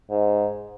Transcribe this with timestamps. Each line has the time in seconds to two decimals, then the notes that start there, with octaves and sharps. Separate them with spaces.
0.10 G#2